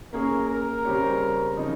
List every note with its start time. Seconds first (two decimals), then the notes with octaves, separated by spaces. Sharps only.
0.13 A#3 C#4 G#4 A#4
0.48 A#4
0.85 C#3 G3 C4 G4 C#5
1.57 C#3 F3 C4 D#4